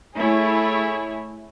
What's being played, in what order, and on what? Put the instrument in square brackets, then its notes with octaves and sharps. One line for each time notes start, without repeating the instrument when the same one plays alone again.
[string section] A3 E4 G#4 C#5